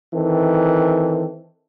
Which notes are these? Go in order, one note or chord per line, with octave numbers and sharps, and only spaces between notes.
D#3 E3 C4 A4